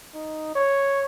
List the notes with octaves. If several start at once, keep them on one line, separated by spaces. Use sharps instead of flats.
D#4
C#5